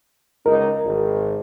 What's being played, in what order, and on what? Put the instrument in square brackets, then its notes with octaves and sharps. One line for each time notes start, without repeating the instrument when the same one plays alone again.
[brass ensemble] C#2 D#4 [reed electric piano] A#4
[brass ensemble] G#1